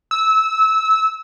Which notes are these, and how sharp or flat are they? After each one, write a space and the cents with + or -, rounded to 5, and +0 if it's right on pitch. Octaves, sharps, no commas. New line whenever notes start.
E6 -20